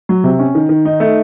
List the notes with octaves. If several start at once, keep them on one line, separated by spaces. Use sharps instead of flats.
F#3
C3
C#4
D#3
D#3
D#4
A3